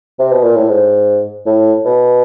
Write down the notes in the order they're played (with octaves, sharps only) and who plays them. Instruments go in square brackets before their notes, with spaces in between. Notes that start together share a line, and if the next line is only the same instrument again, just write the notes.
[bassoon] C3
B2
A#2
A2
G#2
A2
B2